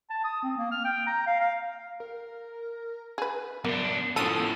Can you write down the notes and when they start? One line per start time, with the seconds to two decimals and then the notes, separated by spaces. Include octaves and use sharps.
0.10 A5
0.24 D#6
0.43 C4
0.58 A#3
0.71 F6
0.84 G5
1.07 A#5
1.26 F5
1.40 F5
2.00 A#4
3.18 G#4 B4
3.65 F#2 A#3 B3 D4
4.16 A2 F3 C#4 F#4 A4 A5 D#6 D#7